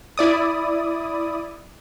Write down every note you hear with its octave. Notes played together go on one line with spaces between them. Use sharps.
E4 D5 D#6